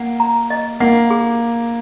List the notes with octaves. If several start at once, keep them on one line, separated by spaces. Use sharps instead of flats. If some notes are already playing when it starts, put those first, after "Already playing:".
Already playing: A#3 F#5
A#5
D#5
A#3 F#5
G#4